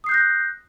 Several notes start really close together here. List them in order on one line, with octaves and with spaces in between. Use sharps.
D#6 C7 G6 F#6 A#6